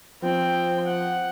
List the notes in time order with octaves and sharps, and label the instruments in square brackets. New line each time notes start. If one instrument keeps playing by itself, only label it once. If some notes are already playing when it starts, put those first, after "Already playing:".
[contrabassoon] F3 [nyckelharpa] C4 G5
[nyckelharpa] F#5